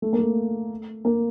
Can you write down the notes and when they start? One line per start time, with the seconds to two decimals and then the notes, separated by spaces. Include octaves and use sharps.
0.02 A3
0.13 A#3
0.19 A3
1.05 A#3